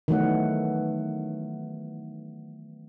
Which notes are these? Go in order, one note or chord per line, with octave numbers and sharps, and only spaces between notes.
D#3 E3 F#3 A3 B3 F#5